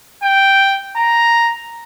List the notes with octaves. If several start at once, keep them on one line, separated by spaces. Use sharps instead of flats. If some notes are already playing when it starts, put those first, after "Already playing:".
G5
A#5